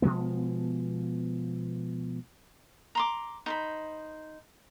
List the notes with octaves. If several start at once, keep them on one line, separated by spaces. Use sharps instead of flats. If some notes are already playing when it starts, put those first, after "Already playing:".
B2 F3 G#3 B3
A#5 C6 D6
D#4 C5 B5